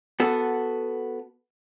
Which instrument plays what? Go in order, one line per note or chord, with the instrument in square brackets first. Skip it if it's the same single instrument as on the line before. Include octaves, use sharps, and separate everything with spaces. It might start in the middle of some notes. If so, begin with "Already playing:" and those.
[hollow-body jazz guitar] B3 F#4 A4